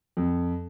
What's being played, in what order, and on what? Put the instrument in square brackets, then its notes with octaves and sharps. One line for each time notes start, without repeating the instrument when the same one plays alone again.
[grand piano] F2